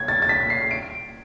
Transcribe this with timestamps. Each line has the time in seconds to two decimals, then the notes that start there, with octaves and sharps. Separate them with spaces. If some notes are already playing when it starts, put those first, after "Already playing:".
Already playing: G#6
0.08 A6
0.22 A6
0.29 B6
0.50 C7
0.71 D7